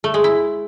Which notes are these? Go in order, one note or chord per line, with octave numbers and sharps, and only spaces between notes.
A3
G#3
E4